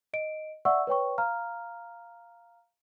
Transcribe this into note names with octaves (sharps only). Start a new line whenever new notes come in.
D#5 D7
D5 E5 F#5 C#6 E6
B4 C#5 G5 C#6
F5 A#5 F6